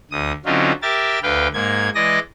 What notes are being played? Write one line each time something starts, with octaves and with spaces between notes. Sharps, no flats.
D2 D#6
D3 F#3 C4 C#4 D#4 F4
G4 A#4 E5 A6
D2 B4 F5 G5
G#2 A#3 G#6
E3 G#3 D5 D#5 A#6